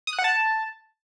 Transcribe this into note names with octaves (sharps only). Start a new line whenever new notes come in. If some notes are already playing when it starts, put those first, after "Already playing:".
D#6
F#6
F#5
A5